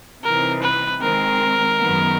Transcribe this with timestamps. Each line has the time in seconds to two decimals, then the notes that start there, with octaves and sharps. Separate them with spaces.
0.24 C3 E3 G3 C4 D#4 A#4
0.62 B4
1.01 D#3 G#3 C4 A#4
1.79 F#2 D#3 G#3 B3